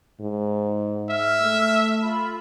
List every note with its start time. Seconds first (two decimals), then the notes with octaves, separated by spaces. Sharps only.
0.20 G#2
1.10 E5 E6 F6
1.41 A3
2.02 F4 B5